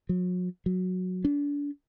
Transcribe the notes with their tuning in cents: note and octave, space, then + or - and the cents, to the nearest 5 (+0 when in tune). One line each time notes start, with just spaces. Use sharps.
F#3 -40
F#3 -10
D4 -30